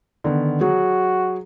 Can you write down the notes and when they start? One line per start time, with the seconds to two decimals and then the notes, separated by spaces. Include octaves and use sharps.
0.24 D3 D#3 B3
0.61 F#3 F#4 G#4